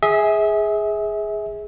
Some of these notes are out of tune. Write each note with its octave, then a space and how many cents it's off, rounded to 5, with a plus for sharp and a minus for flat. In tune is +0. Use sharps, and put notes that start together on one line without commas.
G#4 +0 E5 -30